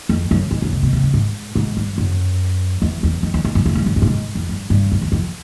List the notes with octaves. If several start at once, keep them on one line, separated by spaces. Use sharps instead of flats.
F2
F#2
F2
F#2
C3
B2
C3
C#3
G#2
G#2
G2
F#2
E2
E2
F2
E2
F2
F#2
F2
G2
F#2
G2
A2
G#2
F2
G2
G2
F#2
E2
F2